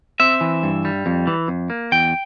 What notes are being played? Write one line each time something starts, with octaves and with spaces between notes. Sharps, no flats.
C4 E5
E3
G2
G3
F2
E3
F2
A#3
E2 G5